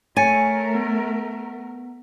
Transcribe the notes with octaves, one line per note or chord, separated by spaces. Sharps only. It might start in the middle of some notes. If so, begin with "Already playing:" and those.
A3 A#4 C#5 G#5 A6 C#7
B3